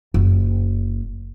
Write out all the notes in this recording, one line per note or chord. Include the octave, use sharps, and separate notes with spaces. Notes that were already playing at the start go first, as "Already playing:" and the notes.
F#1